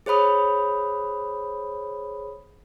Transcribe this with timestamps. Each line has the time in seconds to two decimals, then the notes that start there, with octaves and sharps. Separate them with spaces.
0.06 G#4 C5 C#5 B5 D#6